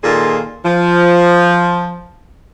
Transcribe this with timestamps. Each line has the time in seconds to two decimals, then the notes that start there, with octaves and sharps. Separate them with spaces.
0.03 A#2 D#3 F4 G#4 A4
0.64 F3